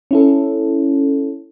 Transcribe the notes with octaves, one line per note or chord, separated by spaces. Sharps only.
C#4 E4 A4